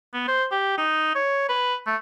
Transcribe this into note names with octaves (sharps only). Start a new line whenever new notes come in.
B3
C5
G4
D#4
C#5
B4
A3